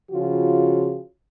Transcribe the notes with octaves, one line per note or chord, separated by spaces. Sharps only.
C#3 F3 F4 F#4